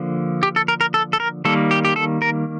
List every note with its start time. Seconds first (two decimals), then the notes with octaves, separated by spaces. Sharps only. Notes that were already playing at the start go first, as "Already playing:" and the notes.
Already playing: D3 F3 A#3
0.43 G4
0.56 A4
0.68 A#4
0.81 A#4
0.94 A4
1.13 A4
1.20 A#4
1.45 D#3 G3 A#3 A4
1.71 G4
1.85 G4
1.96 A4
2.22 A#4